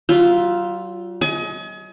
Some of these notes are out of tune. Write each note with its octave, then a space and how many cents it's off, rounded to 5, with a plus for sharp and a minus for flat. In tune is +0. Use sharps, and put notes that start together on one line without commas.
F#3 +40 F4 +0 E5 +0
D#5 +35 G#5 +35